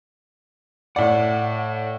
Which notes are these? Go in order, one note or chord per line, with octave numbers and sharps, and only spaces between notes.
A2 D5 F#5